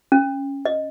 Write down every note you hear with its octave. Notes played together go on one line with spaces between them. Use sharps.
C#4
D#5